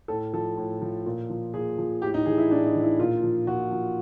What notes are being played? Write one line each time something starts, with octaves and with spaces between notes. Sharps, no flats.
A2 A4
F3 A4
A2
F3
A#2
F3
A#2 G#4
F3
A2 G4
D#4
E3 G#4
E4
A2 D4
D#4
E3
E4
A#2 F4
F3
A#2 F#4
F3